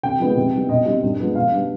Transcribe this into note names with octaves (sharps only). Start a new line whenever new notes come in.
C3 G5
F3 G#3 B3 D#4
C3
G3 B3 D#4
B2 D#5
G3 C4 D#4
G2
F3 G#3 B3
B2 F5
G3 B3 D4